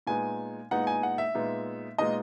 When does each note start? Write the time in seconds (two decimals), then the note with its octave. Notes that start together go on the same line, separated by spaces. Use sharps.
0.07 A#2 G#3 B3 D#4 G#5
0.71 A#2 G#3 B3 D#4 F#5
0.87 G#5
1.03 F#5
1.18 E5
1.35 A#2 G#3 B3 D#4
1.98 A#2 G#3 B3 D#4 D#5